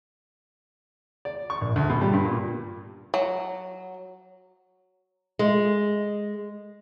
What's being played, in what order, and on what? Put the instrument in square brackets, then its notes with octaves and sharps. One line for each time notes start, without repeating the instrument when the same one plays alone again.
[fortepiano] D5
C#6
A#1
D2
B2
G3
G2
A#2
[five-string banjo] F#3
[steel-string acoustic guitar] G#3